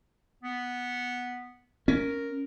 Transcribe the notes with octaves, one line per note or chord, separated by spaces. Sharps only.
B3
C#4 A#4